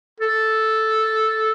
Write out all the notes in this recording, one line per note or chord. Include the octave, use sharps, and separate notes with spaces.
A4